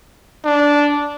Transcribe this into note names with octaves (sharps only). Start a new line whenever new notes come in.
D4